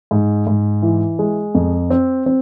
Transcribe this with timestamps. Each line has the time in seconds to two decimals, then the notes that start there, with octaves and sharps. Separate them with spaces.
0.11 G#2
0.47 G#2
0.82 E3
1.19 G#3
1.55 F2
1.90 C4
2.26 C4